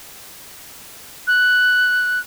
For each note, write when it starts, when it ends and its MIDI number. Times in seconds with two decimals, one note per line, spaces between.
1.27 2.20 90